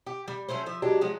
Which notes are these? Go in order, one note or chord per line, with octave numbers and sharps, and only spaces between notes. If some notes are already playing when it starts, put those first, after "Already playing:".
G4
G3
F#3 A3 C#4 C5
F3 E5
F#3 G#3 D4 G4
F3 F#3 G#3